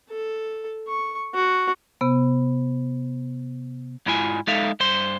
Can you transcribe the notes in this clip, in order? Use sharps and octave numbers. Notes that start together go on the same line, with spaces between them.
A4
C#6
F#4
C3 B3
G#2 G#3 E4 F4 G#5
G#3 D#4 A4 E5 F5
G2 C5 C6